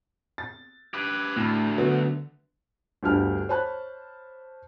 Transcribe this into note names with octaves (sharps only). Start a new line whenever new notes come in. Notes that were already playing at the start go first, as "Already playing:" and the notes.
A6
G4 B4
D2 A2 B5
D3 F#3 B3
G1 D2 G4 A5 F6
C5 C#5 A5 B5 F#6